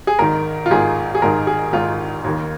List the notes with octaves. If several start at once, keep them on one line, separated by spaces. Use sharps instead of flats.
G#4
G#1 G#2 D#3 A#4
F4
G#1 G#2 D#3 G#4
G#4
G#1 G#2 D#3 A#4
G#4
G#1 G#2 D#3 F4
D#2 D#3